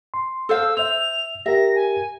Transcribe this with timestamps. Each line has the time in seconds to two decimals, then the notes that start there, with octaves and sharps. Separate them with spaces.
0.14 C6
0.49 A4 C5 F5 E6
0.77 C5 E5 E6 F7
1.46 G4 A#4 E5 A#6
1.75 G#5